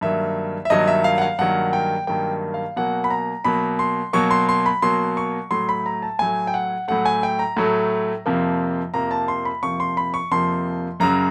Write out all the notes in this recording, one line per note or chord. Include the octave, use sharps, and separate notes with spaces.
G2 D#3 F#3 A#3 E5
E5
G2 D#3 F#3 A#3 D#5
E5
F5
F#5
F5
G2 D#3 F#3 A#3 F#5
G5
G2 D#3 F#3 A#3 G5
F5
B2 F#3 A#3 F#5
B5
A#5
B2 F#3 A#3 B5
C6
B2 F#3 A#3 C#6
C6
C6
B5
B2 F#3 A#3 C6
C#6
A2 F#3 A3 C6
B5
A#5
A5
A2 F#3 A3 G#5
G5
F#5
A2 F#3 A3 F#5
G#5
G5
A#5
A2 F#3 A3
F2 C3 F3 A#3
F2 C3 F3 A#3 A#5
A5
C6
B5
F2 C3 F3 A#3 C#6
C6
B5
C#6
F2 C3 F3 A#3 C6
F#2 C#3 F#3 A#5